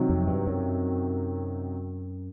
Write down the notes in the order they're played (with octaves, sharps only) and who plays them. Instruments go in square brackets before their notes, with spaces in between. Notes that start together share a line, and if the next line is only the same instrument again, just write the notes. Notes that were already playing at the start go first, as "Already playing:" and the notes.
Already playing: [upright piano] C3 D#3 F#3
[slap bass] F2
G2
F#2